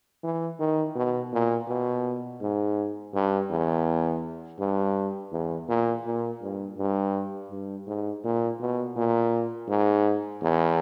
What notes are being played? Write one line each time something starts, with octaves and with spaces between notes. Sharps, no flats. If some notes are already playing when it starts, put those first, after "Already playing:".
E3
D#3
B2
A#2
B2
G#2
G2
E2
G2
E2
A#2
A#2
G2
G2
G2
G#2
A#2
B2
A#2
G#2
E2